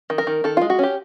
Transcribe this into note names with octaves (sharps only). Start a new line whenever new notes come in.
D#3
A#4
D#3
D#3 A4
G#3 F4
F#4
C#4 G4